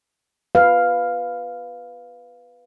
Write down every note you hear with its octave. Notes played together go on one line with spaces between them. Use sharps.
B4 F5